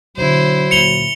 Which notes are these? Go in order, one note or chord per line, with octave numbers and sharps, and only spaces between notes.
B2 D3 F#3 E4 C5
D2 A#2 C#7 F7 G7